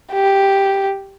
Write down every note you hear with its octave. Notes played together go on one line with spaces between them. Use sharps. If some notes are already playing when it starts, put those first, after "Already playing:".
G4